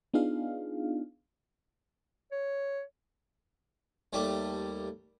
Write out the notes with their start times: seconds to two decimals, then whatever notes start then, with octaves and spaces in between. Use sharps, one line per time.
0.14 B3 D4 D#4 F4 G#4 F5
2.32 C#5
4.13 D#2 G3 A3 D6